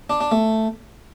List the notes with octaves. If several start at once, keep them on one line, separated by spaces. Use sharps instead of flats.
D4
D4
A3